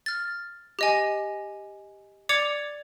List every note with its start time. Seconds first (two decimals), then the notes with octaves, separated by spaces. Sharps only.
0.06 F6 A6
0.79 G4 D#5 G#5
2.29 D5 D6 G#6 C#7 F7